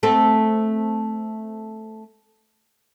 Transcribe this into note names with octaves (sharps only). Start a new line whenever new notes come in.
A3 C4 A4